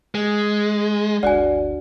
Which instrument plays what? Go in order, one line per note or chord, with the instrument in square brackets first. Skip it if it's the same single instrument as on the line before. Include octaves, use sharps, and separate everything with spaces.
[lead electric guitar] G#3
[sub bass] G1 [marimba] D2 F#4 [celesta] D5 G#5